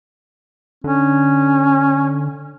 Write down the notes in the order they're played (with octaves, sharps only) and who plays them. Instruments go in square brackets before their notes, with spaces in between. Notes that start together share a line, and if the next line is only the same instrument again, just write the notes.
[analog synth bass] D3 [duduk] C#4